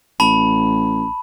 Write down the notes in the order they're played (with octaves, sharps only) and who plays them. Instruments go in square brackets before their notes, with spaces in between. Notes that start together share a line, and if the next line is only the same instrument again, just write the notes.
[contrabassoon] A1 [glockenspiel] A5 B5